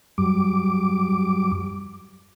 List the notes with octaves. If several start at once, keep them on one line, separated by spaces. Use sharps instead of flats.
F#2 F#3 G3 D6